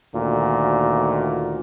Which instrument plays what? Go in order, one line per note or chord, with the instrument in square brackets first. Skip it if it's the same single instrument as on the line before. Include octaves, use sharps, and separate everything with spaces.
[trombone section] D2 A#2 D#3 F#4